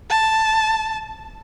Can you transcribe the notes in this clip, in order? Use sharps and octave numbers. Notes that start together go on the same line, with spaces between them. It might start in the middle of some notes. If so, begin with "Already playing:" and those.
A5